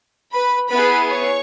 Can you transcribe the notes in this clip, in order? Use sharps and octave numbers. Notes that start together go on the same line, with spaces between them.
B4 B5
B3 E4 G#4 B4 B5
C#5 C#6